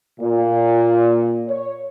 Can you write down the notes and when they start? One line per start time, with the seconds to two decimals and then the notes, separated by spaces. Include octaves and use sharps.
0.21 A#2
1.48 C#5